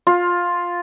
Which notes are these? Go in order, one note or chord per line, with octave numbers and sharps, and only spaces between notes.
F4